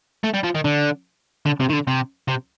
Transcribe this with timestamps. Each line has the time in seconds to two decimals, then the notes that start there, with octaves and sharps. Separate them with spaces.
0.23 A3
0.34 G3
0.43 F3
0.55 D#3
0.64 D3
1.46 D3
1.60 C3
1.69 D#3
1.73 D3
1.87 C3
2.28 C3